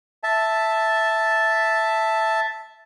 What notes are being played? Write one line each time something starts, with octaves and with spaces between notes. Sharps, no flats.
E5 A5